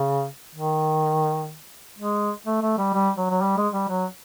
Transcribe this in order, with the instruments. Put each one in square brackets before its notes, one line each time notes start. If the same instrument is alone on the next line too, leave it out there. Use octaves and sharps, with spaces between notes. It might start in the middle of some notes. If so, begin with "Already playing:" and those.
Already playing: [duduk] C#3
D#3
G#3
A3
A3
G3
G3
F#3
F#3
G3
G#3
G3
F#3